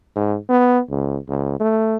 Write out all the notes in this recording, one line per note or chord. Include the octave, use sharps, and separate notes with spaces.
G#2
B3
C#2
C#2
A3